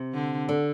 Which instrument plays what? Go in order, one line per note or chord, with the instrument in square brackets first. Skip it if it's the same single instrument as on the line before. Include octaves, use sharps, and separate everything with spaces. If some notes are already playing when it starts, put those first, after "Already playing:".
Already playing: [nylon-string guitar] C3
[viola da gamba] D3
[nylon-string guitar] D3